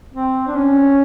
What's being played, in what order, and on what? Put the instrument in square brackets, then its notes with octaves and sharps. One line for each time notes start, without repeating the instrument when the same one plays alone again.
[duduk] C4
D4
C#4